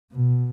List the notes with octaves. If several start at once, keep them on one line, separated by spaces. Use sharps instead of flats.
B2